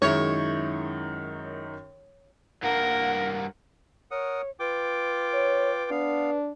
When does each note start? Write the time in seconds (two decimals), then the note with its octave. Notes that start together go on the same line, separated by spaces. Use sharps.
0.02 F#2 D#3 G#3 D#4 E4 C#5
2.63 G2 A#3 A#4 F#5
4.11 A#4 C#5 F#5 D#6
4.60 F4 B4 G5 D6
5.34 C#5
5.91 B3 D4 F5